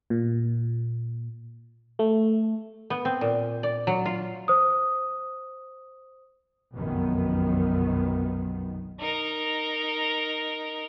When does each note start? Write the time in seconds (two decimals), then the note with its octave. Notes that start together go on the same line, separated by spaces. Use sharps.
0.10 A#2
1.99 A3
2.90 B3
3.05 C4
3.21 A#2
3.63 D5
3.87 F#3
4.06 F4
4.48 C5 D#6
6.74 F1 B1 F#2 D#3 B3
9.00 D#4 A#4